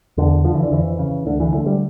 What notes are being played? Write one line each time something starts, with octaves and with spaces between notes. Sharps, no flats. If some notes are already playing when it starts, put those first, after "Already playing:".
E2 D3
D3 F3
E3
D3
F2 E3
C#3
D2 D3
E3
D3 A3
G3